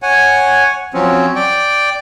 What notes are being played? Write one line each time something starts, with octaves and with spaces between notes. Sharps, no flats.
C#5 F#5 G#5
F3 F#3 C4 C#4
D5 G5